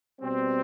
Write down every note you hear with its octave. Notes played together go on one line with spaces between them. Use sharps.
B2 G3 C4